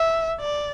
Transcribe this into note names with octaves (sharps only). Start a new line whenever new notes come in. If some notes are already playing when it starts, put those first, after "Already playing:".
Already playing: E5
D5